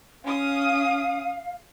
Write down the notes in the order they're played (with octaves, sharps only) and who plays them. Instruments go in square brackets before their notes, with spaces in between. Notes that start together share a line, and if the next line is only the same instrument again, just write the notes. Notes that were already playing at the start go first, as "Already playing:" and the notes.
[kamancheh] C#4 D#6 [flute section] F5